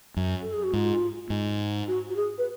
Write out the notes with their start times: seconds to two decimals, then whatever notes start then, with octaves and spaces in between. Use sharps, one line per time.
0.17 F#2
0.41 A4
0.53 G#4
0.63 F#4
0.73 G#2 F4
1.30 G#2
1.87 F#4
2.09 F#4
2.16 G#4
2.38 B4